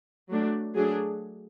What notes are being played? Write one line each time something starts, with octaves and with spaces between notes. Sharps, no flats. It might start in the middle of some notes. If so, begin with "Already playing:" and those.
F#3 A3 D4
F#3 A3 D4 G#4